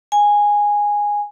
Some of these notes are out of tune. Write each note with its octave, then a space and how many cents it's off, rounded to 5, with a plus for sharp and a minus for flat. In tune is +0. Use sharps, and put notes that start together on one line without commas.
G#5 -10